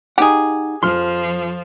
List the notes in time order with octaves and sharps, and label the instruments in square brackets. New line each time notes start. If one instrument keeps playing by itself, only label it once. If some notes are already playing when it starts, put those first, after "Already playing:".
[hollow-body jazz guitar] D#4 F#5 [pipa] G4 G#4
[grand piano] F2 F6 [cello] F3 [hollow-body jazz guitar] C6